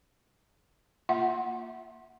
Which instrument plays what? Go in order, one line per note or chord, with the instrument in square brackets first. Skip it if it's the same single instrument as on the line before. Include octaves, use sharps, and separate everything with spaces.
[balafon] A#3 F4 E5 F#5